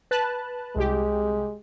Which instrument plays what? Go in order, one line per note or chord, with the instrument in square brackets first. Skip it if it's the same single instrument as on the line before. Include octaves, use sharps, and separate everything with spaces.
[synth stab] B4 A5 F#6
[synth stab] C2 G4 [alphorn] G#3